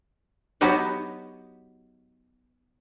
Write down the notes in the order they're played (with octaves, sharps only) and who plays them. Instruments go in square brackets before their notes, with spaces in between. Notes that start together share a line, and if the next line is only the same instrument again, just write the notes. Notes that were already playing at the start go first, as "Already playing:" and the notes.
[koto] F#3 B3 D#4 F#4 G4 B4